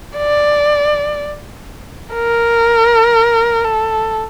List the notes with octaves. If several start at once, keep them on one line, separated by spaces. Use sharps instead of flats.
D5
A#4
A4